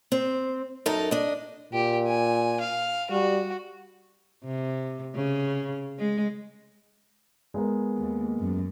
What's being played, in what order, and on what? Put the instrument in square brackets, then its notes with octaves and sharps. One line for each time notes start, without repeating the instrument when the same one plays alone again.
[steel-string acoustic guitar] C4
F#2 D#4 A4 A#4
D4 D#5
[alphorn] A#2 [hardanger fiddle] G4
[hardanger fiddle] G#5
F5
[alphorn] G3 [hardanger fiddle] F#4
[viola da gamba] C3
C#3
G#3
[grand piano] G#3 B3 A#4
[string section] D#2
F#2